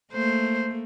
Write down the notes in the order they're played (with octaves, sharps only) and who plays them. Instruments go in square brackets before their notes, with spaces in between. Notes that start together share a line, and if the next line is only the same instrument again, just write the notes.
[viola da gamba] A3 A#3 [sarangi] C5